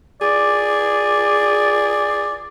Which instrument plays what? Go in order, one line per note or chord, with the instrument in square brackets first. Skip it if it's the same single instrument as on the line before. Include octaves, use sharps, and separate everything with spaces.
[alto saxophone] G#4 [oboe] D5